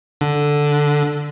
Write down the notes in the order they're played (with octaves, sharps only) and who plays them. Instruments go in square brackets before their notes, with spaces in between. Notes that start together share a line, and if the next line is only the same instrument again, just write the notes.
[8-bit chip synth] D3